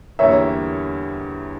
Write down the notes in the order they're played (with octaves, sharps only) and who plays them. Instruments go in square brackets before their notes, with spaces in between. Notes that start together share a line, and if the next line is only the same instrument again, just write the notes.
[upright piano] E2 D3 G3 A#3 [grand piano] C#5 E5